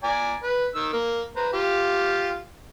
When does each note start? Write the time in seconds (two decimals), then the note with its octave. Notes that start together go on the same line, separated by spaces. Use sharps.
0.04 D5 G#5 A#5
0.43 B4
0.75 D#3 E6
0.93 A#3
1.36 B4 C5 A#5
1.53 F4 G4